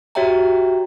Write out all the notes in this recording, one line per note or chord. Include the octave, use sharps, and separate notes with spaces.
F#4 G4 C#5 E5 G5 A#5